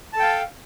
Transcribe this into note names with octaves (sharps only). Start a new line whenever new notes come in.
A4 F5 G5 A5